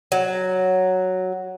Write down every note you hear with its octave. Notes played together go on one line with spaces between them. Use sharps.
F#3